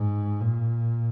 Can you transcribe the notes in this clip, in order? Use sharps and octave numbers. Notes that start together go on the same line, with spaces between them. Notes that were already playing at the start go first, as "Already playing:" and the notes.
Already playing: G#2
A#2